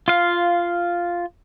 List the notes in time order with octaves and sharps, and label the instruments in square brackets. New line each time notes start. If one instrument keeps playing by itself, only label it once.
[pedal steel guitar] F4 F5